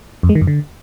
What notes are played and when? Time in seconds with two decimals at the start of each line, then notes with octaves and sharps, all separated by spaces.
0.23 F2
0.29 G#3
0.35 D#3
0.41 F#2
0.47 D3